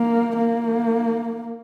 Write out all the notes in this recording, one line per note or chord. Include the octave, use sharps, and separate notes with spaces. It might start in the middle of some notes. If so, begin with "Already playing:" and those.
Already playing: A#3
A#3